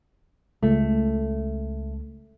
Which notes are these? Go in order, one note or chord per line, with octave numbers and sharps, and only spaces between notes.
C#2 A3